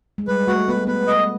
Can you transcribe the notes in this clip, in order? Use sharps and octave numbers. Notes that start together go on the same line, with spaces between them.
G#3
G3 B4
A3 F#4
B3 B4
B3 B4
D#5